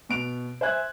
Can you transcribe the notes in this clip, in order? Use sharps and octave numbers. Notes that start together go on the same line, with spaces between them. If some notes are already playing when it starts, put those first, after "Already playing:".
B2 D7 F7
C5 E5 G#5 F#6 G#6